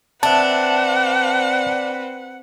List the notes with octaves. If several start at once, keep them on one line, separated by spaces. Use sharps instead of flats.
C4 D4 B4 E5 F#5 A5